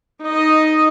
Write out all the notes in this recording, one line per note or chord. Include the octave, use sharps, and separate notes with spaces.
D#4 D#5